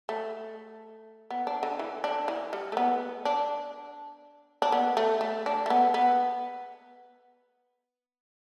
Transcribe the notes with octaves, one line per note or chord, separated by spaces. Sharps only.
A3
B3
D4
D3
E3
D4
E3
G3
A3
B3
D4
D4
B3
A3
A3
D4
A3
B3
B3